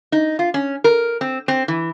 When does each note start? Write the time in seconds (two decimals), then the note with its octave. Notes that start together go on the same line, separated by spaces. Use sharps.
0.12 D#4
0.39 F4
0.54 C#4
0.84 A#4
1.21 C4
1.48 C4
1.68 E3